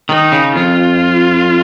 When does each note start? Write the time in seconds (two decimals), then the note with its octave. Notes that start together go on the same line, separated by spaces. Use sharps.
0.09 D#3 D#4
0.32 C#3
0.55 F2 F4